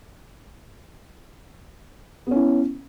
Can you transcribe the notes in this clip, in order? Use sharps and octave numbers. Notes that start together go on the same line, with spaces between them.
B3 C#4 E4